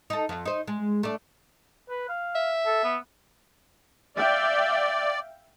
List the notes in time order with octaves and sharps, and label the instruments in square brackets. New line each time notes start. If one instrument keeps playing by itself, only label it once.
[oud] D#4 A4
F2
D#4 C5
G#3
A3 D4
[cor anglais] B4
F5
[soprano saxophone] E5
[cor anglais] A4
B3
[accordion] D5 [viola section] E5 F5 G5